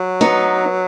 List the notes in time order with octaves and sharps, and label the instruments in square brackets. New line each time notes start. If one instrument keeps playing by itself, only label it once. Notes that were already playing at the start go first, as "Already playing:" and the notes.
Already playing: [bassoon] F#3
[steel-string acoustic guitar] B3 D#4